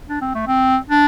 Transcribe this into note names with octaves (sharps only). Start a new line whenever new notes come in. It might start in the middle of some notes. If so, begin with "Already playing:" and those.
D4
C4
A3
C4
D4